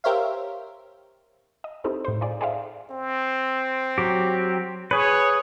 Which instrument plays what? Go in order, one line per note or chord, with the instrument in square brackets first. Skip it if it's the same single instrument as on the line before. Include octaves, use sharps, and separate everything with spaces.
[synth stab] G4 A#4 C5 C#5 E5 F5
[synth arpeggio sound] D#5
C4 D#4 E4 G4 A4 C5
A2 C5
D#4 F4 G#4 D5
G#4 A4 C5 D5 E5 F5
[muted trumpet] C4
[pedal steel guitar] F#3 G4
[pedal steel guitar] G#4 B4 [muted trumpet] C#5